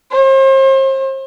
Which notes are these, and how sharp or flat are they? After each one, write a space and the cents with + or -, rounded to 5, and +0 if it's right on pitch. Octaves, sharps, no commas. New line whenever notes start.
C5 +40